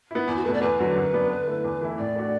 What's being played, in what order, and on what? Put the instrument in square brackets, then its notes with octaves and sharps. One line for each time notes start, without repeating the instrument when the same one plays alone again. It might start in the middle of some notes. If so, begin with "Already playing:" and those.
[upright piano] B3 E4
[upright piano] E2 [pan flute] E4
[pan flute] F#4
[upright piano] B2 A3 [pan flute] B4
[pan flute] D5
[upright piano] E2 [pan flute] B4
[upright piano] D3 F#3
F#2
F#3 B3 D4
D3
A3 E4
E2
E3 A3 E4
[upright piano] A2 [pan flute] D5
[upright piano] A3 D4 F#4